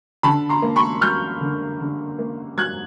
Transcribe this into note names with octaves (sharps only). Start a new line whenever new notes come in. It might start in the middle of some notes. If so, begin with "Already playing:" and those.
D3 A5 B5
A#5 C6
A#3
B5 C#6
F#3 F6 G6
D3
D3
A#3
F#3 F#6 G#6